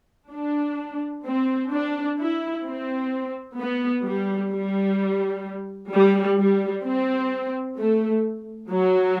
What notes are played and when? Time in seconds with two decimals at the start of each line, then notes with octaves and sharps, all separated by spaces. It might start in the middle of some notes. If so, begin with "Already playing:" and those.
0.32 D4
1.26 C4
1.72 D4
2.19 E4
2.65 C4
3.58 B3
4.05 G3
4.52 G3
5.92 G3
6.38 G3
6.85 C4
7.78 A3
8.71 F#3